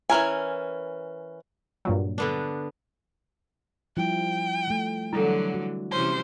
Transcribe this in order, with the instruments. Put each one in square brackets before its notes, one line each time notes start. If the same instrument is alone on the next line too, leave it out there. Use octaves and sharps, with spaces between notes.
[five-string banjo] E3 C#4 A#4 G#5
[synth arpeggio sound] G2 A#2 F#3
[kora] D3 B3 D4
[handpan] F3 G3 E4 [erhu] G5
[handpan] F3 A3
[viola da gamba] D3 E3 F#3 [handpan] G3 [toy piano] E4 A4
[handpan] F#4
[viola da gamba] C3 E3 C#4 [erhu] C5